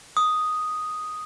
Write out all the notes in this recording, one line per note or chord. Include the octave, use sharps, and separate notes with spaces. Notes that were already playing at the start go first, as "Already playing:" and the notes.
D#6